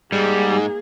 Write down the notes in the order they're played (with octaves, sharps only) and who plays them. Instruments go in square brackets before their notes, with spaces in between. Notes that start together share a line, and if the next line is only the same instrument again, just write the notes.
[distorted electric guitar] G#2 [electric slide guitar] G3 [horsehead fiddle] A#3 G#4